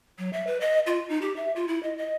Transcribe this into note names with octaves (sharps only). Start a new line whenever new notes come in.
F#3
E5
B4
D#5
F4
D#4
G4
E5
F4
E4
D#5
D#5